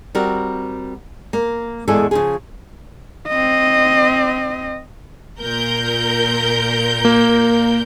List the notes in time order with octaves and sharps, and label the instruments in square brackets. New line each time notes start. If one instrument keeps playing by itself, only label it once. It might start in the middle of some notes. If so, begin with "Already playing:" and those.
[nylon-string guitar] G3 C4 F#4 A#4
A#3
E2 A2 G#3 D4 G#4 A4
C#3 F3 G#4
[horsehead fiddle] C4 D#5
[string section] A#2 A#4 G6
[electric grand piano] A#3